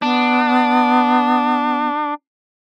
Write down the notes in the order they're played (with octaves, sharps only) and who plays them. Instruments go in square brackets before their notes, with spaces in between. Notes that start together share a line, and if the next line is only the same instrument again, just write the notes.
[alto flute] B3 [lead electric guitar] D4